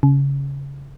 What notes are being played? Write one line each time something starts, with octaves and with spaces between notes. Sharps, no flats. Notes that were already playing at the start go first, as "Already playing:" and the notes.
C#3